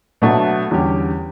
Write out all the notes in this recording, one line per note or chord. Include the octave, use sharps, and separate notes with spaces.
B2 F#3 A3 D4 F#4
E2 D3 G3 C#4 G4